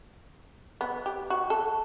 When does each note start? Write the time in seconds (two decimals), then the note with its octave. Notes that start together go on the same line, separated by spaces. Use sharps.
0.81 B3
1.06 G4
1.30 F#4
1.50 A4